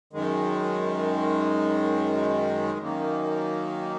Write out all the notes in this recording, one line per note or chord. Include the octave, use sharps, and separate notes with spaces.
F#2 D#3 G#3
F#2 D#3 A#3